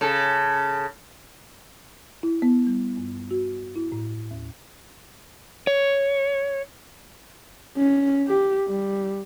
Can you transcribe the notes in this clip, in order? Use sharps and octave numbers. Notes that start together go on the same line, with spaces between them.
C#3 A4
E4
B3
G3
G2
F#4
E4
A2
D#2
C#5
C#4
G4
G3